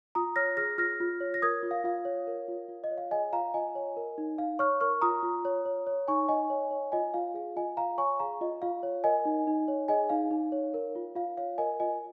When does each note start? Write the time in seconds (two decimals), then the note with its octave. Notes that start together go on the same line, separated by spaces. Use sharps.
0.15 F4 A#5 D#6
0.36 C#5 F6 A#6
0.57 G#4 F6 A#6
0.78 F4 F6 A#6
1.00 F4
1.20 C#5
1.34 A#6
1.42 A#4 D#6 G#6
1.63 F4
1.71 F5
1.84 F4 F5
2.05 C#5
2.27 A#4
2.48 F4
2.69 F4
2.84 D#5
2.91 C#5
2.98 F5
3.11 G#4 D#5 G#5
3.33 F4 F5 A#5
3.54 F4 D#5 G#5
3.75 C#5
3.97 A#4
4.18 D#4
4.38 D#4 F5
4.59 C#5 C#6 F6
4.81 A#4 C#6 F6
5.01 F4 A#5 D#6
5.23 F4
5.45 C#5
5.65 C#5
5.87 C#5
6.08 D#4 G#5 C#6
6.28 D#4 D#5 G#5
6.50 C#5
6.71 C#5
6.92 F4 D#5 G#5
7.14 F4 F5
7.34 G#4 F5
7.56 F4 D#5 G#5
7.77 F4 F5 A#5
7.98 C#5 G#5 C#6
8.19 G#4 F5 A#5
8.41 F4 D#5
8.62 F4 F5
8.83 C#5
9.04 A#4 D#5 G#5
9.25 D#4
9.47 D#4
9.68 C#5
9.88 G#4 D#5 G#5
10.10 D#4 F5
10.31 D#4
10.52 C#5
10.74 A#4
10.95 F4
11.15 F4 F5
11.37 C#5 F5
11.58 A#4 D#5 G#5
11.80 F4 D#5 G#5